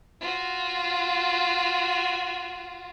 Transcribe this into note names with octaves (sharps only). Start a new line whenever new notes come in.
F4 F#4